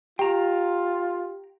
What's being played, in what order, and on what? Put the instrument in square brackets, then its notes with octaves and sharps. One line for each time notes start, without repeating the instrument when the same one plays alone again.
[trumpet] F4 [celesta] G4 [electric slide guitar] G5 A#5